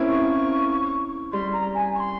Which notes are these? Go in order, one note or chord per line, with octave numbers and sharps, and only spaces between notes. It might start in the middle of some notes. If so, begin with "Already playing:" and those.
Already playing: A#3 C4 C#4 E4
C#6
G3 C6
A#5
G#5
C#6
C6